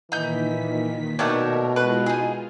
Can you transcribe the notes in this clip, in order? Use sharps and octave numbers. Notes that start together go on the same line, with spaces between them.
A#2 D#3 E3 D#4 G6 B6
B2 D#3 A3 D4 A#4 C#5
G#3 E4 F4 B4
D#4 F4 G#4